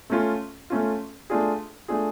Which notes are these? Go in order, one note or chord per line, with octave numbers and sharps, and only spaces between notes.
A3 C#4 F4
A3 C#4 F4
A3 D4 F4 G#4
A3 D4 F4 G#4